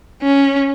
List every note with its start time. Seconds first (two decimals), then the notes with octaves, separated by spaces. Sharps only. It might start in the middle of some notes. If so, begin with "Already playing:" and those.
0.23 C#4